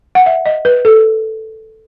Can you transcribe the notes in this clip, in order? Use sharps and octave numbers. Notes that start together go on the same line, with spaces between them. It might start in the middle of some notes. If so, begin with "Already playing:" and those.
F#5
E5
D#5
B4
A4